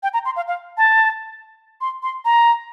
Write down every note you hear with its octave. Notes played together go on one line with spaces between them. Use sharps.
G5
A#5
C6
F5
F5
A5
C6
C6
A#5